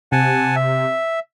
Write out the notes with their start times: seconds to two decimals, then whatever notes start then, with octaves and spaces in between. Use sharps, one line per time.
0.12 C3 F#5 G#5 A5
0.56 E5